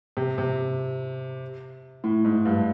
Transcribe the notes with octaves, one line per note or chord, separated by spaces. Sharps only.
C3
C3
A2
G#2
G2